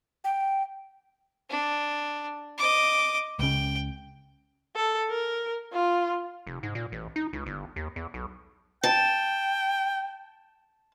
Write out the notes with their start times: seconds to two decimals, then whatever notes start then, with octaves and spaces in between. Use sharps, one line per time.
0.24 G5
1.50 D4
2.58 D#5 D6
3.39 C#2 C#3 G5
4.76 A4
5.10 A#4
5.72 F4
6.47 F1
6.63 G#2
6.75 A#2
6.92 A1
7.16 D#4
7.33 C#2
7.46 G1
7.76 D#2
7.96 E2
8.14 B1
8.83 G5 A5